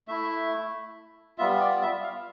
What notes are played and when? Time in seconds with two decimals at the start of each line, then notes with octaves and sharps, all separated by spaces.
0.08 A3 E4 E5
1.38 G3 B3 F4 E5
1.60 D5
1.82 E5
2.03 F5